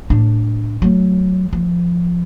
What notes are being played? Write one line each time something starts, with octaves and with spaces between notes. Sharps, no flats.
A2 D4
F#3 A3
F3